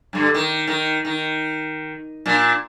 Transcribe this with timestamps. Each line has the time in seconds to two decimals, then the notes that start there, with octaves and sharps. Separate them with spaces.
0.13 G2 D3
0.34 D#3
0.67 D#3
1.05 D#3
2.26 A#2 D4